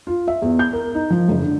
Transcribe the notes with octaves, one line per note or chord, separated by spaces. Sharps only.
F4
E5
E2
G6
A#4
D#4
F3
F#1
D3